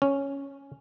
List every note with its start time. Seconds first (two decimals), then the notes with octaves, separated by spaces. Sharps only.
0.02 C#4